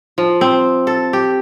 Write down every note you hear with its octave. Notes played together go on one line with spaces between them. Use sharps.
F3
C4
A4
G4